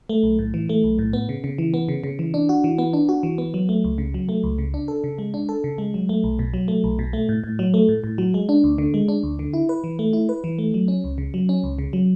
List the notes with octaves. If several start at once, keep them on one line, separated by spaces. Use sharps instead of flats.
A3
B1
A2
E3
A3
B1
A2
B3
C#3
C#3
E3
B3
C#3
C#3
E3
D4
F#4
E3
B3
D4
F#4
E3
B3
F#3
A3
C#2
C#3
F#3
A3
C#2
C#3
D4
A4
C#3
G#3
D4
A4
C#3
G#3
F#3
A3
B1
B2
F#3
A3
B1
B2
A3
A2
A2
F#3
A3
A2
A2
F#3
G#3
D4
D2
D3
G#3
D4
D2
D3
E4
B4
E3
A3
E4
B4
E3
A3
F#3
C#4
C#2
C#3
F#3
C#4
C#2
C#3
F#3